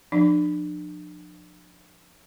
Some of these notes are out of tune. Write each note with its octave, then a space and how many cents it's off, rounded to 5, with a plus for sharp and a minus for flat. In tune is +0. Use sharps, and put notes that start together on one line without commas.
F3 +25 D4 +40